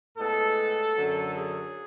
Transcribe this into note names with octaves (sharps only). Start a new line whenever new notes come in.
A2 G#3 B3 A4
F#2 D3 F#3
G#4